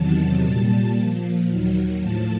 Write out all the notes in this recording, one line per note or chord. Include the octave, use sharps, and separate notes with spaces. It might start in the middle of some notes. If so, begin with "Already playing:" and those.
Already playing: E2 C3 D#3 F#3 A5
A#2 G3
A#2 F3
D#2 D#3 F#3
A2 F3 A5